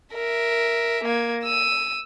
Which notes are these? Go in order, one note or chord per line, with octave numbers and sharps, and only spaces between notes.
A#4 E5
A#3 G#6
E6 D#7